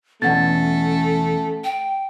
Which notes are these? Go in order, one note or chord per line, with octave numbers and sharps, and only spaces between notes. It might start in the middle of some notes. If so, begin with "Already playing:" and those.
E2 B2 A3 C#4 F#5 A6
G5